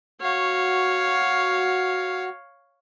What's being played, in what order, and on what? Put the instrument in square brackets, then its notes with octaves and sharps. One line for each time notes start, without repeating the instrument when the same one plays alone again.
[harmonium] F#4 [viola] C#5 F5